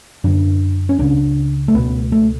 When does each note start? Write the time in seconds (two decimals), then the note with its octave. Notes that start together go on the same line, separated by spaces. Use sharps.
0.24 F#2 D3 D4
0.89 C#4
0.99 C#2 C#3 D4
1.68 A3
1.74 C#2 B2 B3
2.12 A3